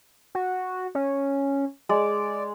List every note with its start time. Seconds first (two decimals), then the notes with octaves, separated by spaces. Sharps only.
0.35 F#4
0.95 C#4
1.89 G#3 D5